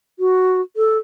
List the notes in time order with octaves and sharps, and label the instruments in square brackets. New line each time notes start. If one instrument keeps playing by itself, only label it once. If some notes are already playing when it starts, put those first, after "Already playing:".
[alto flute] F#4
A4